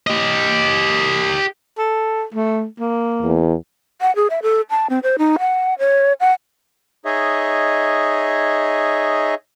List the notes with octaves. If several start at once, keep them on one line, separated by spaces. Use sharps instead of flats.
G4 D#5
A4
A3
A#3
E2
F#5
G#4
E5
A4
A5
C4
C5
D#4
F#5
C#5
F#5
D#4 G#4 C#5 D#5 E5